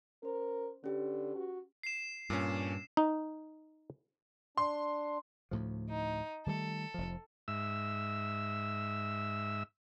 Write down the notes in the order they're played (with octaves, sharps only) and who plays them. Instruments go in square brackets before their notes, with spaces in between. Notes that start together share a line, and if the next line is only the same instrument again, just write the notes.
[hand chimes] C#4 C5 [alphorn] A#4
[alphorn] D3 [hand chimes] C#4 G4 B4
[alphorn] F#4
[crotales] C7 E7
[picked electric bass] G2 [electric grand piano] A#2 C#4
[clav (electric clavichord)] D#4
[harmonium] D4 [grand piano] C6
[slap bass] D2 A2 F3
[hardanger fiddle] D#4
[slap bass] D#3 G3 A3 [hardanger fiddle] A4
[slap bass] F1 F3
[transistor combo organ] G#2 E5 E6